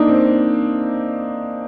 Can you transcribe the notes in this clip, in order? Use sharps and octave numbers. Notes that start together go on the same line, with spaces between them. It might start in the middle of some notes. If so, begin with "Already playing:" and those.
Already playing: A#3 D4 D#4
C4